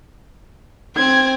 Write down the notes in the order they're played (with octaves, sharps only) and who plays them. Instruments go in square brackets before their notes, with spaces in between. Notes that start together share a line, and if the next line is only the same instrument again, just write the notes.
[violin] C4 [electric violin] G#6